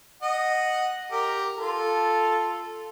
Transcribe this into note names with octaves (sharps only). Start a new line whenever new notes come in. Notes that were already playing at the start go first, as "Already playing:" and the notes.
D#5 F#5
G4 A#4
F4 A4